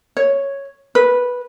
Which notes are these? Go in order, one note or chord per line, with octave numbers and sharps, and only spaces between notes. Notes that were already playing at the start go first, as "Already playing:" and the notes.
C#5
B4